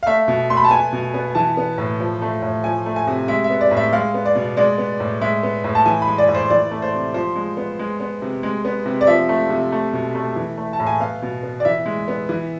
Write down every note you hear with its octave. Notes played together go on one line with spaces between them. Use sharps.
F5
A3 E5
B2
A3 C6
B5
A5
B3 G#5
B2
B3
E3 A5
B3
A2
F3
A3
A2
F3 G#5
A3
G#5
C3
G#3 E5
E5
B3
D5
A2
E5
G#3 F5
B3
D5
B2
G#3 D5
B3
A2
G#3 E5
B3
A2
A5
E3 G#5
B5
G#3
D5
A2
C5
E3 D5
A3
C5
C3
F3 C5
G#3
B3
G#3
B3
C3
G#3
B3
C3
D5
F3 E5
A3
C3
A3
B2
A3
E3
A3
A5
A2
G#5
B3 F5
B2
B3
D5
E3 E5
G#3
B3
E3